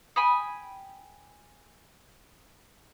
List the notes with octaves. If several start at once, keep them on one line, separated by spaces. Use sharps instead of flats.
G5 G#5 B5 D#6